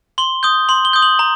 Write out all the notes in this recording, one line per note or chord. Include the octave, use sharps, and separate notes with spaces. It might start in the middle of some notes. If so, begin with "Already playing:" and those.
C6 G7
D#6 G6 G7
C6 F#7
G7
D#6 G6
F#7
A#5